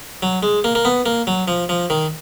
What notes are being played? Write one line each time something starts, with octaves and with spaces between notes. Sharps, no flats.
F#3
G#3
A#3
A#3
B3
A#3
F#3
F3
F3
D#3